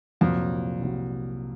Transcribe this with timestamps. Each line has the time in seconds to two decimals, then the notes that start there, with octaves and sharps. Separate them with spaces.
0.21 C2 F2 A#2 F#3
0.81 C2 A#2 F#3